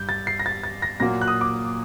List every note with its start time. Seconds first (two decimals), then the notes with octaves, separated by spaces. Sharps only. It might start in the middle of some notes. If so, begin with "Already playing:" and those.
Already playing: G2 G6
0.09 A6
0.27 C7
0.39 A#6
0.46 A6
0.64 A6
0.82 A#6
1.00 A#2 F#3 A#3 A#6
1.22 F#6
1.28 D#6
1.41 D6